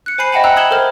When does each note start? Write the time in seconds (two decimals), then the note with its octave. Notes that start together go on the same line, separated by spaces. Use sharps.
0.06 F#6 C#7
0.18 C5 G#5 B5 C7 D#7
0.32 D#5 E5 F#5 G5 A5 B5
0.44 G5 A#5 E6 F#6
0.56 B5 D#6 G#6 E7 F#7 G7
0.71 A4 A#4 C5 F6